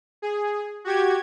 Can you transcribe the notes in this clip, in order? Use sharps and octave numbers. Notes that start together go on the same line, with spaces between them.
G#4
F#4 G4 G#6